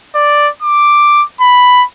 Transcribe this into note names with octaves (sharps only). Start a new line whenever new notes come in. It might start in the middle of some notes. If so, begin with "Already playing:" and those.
D5
D6
B5